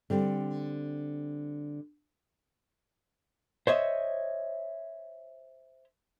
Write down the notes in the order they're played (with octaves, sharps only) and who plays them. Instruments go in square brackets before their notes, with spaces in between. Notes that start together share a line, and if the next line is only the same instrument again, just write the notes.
[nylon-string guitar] D3 G3 C4
[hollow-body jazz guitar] C5 C#5 D#5 E5